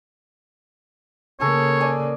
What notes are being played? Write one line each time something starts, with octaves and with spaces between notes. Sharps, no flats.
C#3 A#3 G#4 A4 C#5
D5 G#5 A5